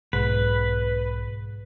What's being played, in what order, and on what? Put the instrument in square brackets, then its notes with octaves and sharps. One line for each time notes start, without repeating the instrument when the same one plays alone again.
[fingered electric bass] B1 [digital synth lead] G#2 [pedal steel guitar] B4